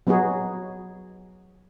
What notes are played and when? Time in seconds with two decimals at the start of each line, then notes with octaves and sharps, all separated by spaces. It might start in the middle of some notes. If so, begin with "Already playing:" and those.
0.07 F#3 B3 D#4 F#4 G#4